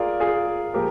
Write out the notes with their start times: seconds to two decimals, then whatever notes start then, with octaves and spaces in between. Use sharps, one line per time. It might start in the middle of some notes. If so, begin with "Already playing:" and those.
Already playing: F4 G#4 A#4 D5
0.20 F4 G#4
0.74 A#2 F3 G#3 G4 A#4